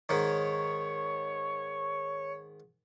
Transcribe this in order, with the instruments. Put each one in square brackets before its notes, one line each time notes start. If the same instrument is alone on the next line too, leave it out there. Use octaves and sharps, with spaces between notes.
[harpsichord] G#2 D#3 [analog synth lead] C#5